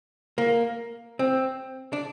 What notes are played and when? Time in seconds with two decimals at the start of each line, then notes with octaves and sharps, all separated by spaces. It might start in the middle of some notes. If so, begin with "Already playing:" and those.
0.38 A#3
1.19 C4
1.93 D4